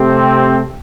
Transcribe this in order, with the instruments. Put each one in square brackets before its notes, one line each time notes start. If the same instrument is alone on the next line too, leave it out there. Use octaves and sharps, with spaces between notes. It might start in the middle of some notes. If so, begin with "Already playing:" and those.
Already playing: [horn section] C3 A3 C4 G4